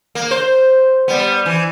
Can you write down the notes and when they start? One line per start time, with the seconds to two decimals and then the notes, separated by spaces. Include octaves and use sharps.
0.15 A#3
0.31 C5
1.08 G3 B3
1.46 E3